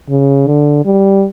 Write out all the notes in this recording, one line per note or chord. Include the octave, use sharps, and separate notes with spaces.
C#3
D3
G3